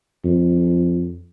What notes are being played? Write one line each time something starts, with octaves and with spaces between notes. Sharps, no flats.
F2